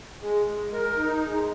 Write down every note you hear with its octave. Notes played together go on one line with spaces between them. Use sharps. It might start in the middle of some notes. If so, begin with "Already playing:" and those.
G#3
G#3
A#4
D#4
G#3